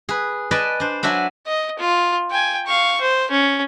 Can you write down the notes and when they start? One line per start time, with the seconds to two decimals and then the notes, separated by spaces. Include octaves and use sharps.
0.09 G#4 B4
0.51 B4 D5 D#5 G#5 A5
0.80 D4 C5
1.03 F#3 D4 F#4 E5 G#5
1.47 D#5
1.79 F4
2.31 G5 G#5
2.67 F5 C#6
3.01 C5
3.31 C#4